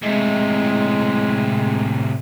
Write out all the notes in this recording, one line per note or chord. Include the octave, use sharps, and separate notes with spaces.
A2 C3 G#3